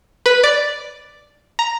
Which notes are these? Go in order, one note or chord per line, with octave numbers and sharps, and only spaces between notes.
B4
D5
A#5